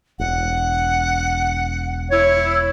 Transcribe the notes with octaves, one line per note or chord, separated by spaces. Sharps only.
E1 F#5
E4 C#5